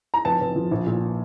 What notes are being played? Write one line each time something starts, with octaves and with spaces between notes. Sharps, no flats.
A#5
F1 A5
F1
F3
A#1
A#2